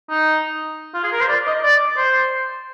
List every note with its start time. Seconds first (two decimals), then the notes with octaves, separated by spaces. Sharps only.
0.10 D#4
0.94 F4
1.04 G#4
1.12 A#4
1.21 C5
1.29 D5
1.47 D#5
1.63 D5
1.97 C5